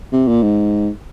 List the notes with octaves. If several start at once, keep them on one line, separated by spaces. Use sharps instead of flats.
C3
A#2
G#2